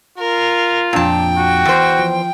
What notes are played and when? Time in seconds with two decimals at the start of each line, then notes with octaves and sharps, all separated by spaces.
0.18 F4 A#4
0.93 F2 A#2 D4 G5 A5 A#5
1.37 F#4
1.65 E2 C5
1.99 F3